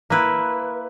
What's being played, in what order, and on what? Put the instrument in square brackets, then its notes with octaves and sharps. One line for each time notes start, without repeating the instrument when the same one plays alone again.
[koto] A#3 E4 B4